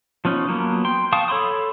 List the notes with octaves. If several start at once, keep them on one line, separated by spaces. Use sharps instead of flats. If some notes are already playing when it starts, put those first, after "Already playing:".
F3 B3 C#4 D#4
F3 F#3 A#3 B3
G5 C6
F5 G5 A5 C#6 D#6
A4 C#5 B5 C6 D#6